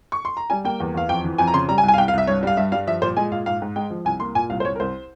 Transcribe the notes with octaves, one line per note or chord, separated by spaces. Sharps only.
C#6
C6
A#5
G3 G#5
A#3 G5
E2
E2 F5
F2 G5
E3
F2 G#5
A#5
C#3 C6
G3 A#5
G#5
C2
G#5
F5
C2 G5
F5
C2 E5
G2 C#5
G3 F5
G2 E5
G3 F5
F3 E5
A#2 C5
G#3 G#5
A#2 F5
G#2 F5
G#2
G#3 G5
F3
C2 G#5
A#3 C6
A#2 G#5
C2 F5
C5
C2 C#5
A#4
C2 C5